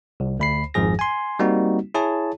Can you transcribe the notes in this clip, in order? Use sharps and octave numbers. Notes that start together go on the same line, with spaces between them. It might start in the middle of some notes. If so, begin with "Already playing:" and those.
C2
D2 B5 C7
G#1 F2 G#2 F3 G#4 A#6
G#5 C6
G3 A#3 C4 D#4 F#4
E4 G#4 C#5 A5